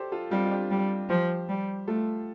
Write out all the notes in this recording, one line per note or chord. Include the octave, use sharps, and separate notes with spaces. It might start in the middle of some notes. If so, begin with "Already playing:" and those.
Already playing: G4 A4 C5 D5
F4 A4
G3 C4 F4
F4
D4 G4
G3
F3 G4 C5
G3
A3 F4 A4